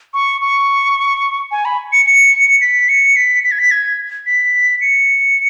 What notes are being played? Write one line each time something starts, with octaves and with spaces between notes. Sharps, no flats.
C#6
C#6
G#5
B5
C#7
C#7
B6
C#7
B6
B6
G#6
B6
G#6
B6
C#7